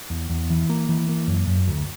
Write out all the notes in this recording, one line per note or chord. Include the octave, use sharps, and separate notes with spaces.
E2
E2
E3
A#3
E3
A#3
F#2
F#2
D2